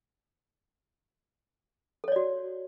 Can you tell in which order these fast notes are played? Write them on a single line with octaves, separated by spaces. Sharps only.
A4 C#5 D5 F#4